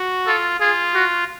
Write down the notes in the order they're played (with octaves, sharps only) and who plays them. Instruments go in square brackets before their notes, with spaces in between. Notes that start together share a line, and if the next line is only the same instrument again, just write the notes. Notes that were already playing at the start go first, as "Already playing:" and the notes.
Already playing: [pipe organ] F#4
[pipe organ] F4 [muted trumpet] A4
[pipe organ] F4 [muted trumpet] G#4
[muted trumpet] F#4